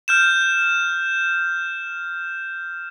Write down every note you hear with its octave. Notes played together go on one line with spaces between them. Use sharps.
F6 G6 E7